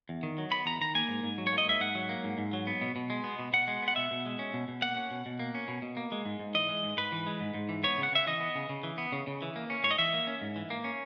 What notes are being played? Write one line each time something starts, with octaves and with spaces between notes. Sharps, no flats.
E2
D#3
F#3
B3 B5
E2 A#5
D#3 A#5
A#3 G#5
G#2
G#2
F#3
C#5
A#3
D#5
G#2 E5
G#2 F#5
F#3
A#3
G#2
G#2
F#3
B3
B2
B2
G#3
B3
B2
B2 F#5
G#3
B3
F#5
B2 E5
B2
G#3
C#4
B2
B2
A#3 F#5
C#4
B2
B2
A#3
C#4
B2
B2
A#3
G#3
G#2
G#2
E3 D#5
G#3
G#2
G#2 B4
E3
G#3
G#2
G#2
E3
B3 C#5
C#3
F#5
C#3 E5
E3 D#5
B3
C#3
C#3
E3
B3
C#3
C#3
E3
A#3
C#4
G#2 C#5
D#5
E3 E5
A#3
C#4
G#2
E3
A#3
C#4